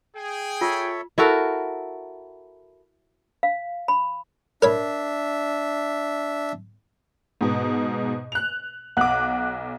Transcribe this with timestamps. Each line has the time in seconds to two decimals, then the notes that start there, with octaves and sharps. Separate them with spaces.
0.17 G#4 G5
0.61 F4 A4 C#5 E5
1.18 E4 F#4 A4 A#4
3.43 F5
3.88 B5
4.62 D4 A#4 C#5 E5 B5
7.41 G#2 B2
8.32 F#6 F7
8.97 B1 F#5 D6 F#6